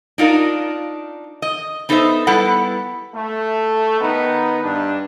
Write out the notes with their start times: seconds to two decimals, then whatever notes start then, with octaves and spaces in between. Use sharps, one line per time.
0.18 D4 D#4 F4 A#4
1.42 D#5
1.89 B3 D#4 A4 B4 C5 E5
2.27 G3 B3 E4 A4 B4 F#5
3.14 A3
4.00 D#3 B3 D#4
4.64 G2 D4